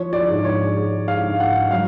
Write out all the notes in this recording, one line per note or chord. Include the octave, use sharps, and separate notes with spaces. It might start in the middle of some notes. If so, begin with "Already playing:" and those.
Already playing: F3 C#5
D5
G#2
C#5
G#3
F5
G#2
F#5
F#3 F5